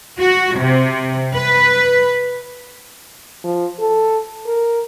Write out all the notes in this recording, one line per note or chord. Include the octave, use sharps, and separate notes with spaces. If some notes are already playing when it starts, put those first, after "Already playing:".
F#4
C3
B4
F3
A4
A#4